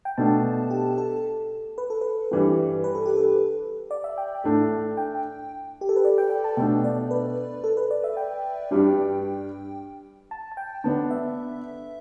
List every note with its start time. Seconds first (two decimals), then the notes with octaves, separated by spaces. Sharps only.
0.05 G5
0.17 B2 A3 D4 A5
0.70 G4
0.98 A4
1.78 B4
1.90 A4
2.01 B4
2.31 G2 E3 G3
2.84 B4
2.95 A4
3.06 G4
3.16 A4
3.91 D5
4.04 E5
4.18 G5
4.44 A2 A3 D4
4.97 G5
5.81 G4
5.89 A4
5.96 B4
6.05 D5
6.18 G5
6.30 G5
6.44 A5
6.57 B2 A3 D4 G5
6.84 D5
7.11 B4
7.64 A4
7.77 B4
7.91 D5
8.04 E5
8.17 G5
8.71 G2 G3 D4
10.31 A5
10.52 A5
10.57 G5
10.84 D3 B3 D4 A5
11.10 E5